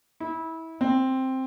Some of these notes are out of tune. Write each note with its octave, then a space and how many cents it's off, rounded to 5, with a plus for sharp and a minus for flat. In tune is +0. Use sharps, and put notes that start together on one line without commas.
E4 -25
C4 +5